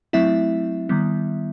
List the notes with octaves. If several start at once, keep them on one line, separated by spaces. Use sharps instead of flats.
F#3 A3 C4 E4 E5
D#3 G3 B3